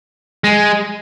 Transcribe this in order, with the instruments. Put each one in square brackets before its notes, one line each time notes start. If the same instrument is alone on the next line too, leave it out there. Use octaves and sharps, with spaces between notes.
[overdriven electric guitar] G#3